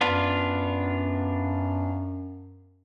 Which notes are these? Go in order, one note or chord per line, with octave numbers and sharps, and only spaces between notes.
F#2 B3 D4 F4